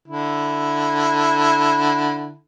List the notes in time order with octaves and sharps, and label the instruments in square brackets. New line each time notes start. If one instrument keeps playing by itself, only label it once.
[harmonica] D3 E4